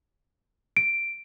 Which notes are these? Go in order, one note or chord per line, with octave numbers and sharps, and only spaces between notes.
D7